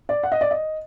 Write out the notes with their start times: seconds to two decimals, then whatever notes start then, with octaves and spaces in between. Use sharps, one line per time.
0.09 D5
0.23 F#5
0.32 D#5
0.41 D5
0.51 D#5